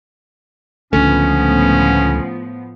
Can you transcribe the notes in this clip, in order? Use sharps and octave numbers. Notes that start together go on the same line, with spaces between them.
C#2 A2 D3 F3 A3 B3 C#4